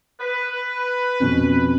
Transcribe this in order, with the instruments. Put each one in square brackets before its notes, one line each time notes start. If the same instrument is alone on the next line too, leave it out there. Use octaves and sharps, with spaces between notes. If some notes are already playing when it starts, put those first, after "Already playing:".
[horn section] B4
[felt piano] F2 B2 C#4